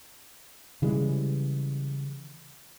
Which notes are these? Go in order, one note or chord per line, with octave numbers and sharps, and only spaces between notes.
C#3 E3 G3 G#3